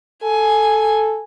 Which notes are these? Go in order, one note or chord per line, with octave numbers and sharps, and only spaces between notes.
A4 G#5